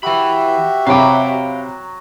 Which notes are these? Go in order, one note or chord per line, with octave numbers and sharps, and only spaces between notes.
E3 F#4 G4 E5 B5
C3 F#3 F5 G5 B5 D6